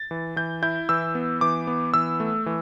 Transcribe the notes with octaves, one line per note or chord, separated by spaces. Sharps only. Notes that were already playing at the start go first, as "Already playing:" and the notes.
Already playing: A6
E3
E3 G6
E4 G6
E3 E6
B3
E3 D6
B3
E3 E6
A3
E3